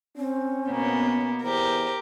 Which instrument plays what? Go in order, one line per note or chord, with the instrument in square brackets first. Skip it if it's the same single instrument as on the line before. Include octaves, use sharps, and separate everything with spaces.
[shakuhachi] C4 [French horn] C#4
[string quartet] B2 A#3 B3
[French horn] E2 [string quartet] G4 A#4 [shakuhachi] C5